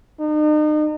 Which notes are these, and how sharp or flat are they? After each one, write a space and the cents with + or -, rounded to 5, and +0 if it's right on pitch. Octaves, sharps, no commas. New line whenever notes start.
D#4 -40